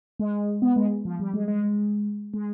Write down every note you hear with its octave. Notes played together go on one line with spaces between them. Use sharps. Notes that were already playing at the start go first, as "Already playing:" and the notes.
G#3
B3
G#3
F3
G3
G#3
G#3
G#3